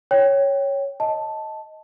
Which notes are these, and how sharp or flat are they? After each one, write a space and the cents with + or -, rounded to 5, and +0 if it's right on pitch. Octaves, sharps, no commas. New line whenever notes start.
C#5 +0 G5 +0
D#5 +10 A5 +0